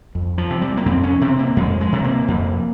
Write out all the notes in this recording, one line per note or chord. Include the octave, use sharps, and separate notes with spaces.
F2
F3
C3
G3
A#3
F2 C4
C#4
C3 C4
A#3
F2 G#3
G#3
C3
A#3
F2